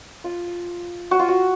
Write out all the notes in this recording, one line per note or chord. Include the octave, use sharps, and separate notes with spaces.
F4
F#4
F4
F#4